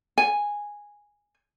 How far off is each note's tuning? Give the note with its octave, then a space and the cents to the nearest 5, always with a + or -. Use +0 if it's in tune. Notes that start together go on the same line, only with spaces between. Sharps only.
G#5 -10